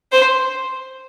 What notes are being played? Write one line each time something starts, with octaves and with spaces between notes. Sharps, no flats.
C5